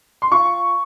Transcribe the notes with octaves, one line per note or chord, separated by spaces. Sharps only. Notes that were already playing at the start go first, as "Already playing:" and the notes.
C6
F4 C#6